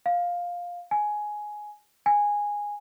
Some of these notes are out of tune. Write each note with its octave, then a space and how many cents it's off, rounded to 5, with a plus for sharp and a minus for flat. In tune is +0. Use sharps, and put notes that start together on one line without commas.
F5 +10
G#5 +10
G#5 -10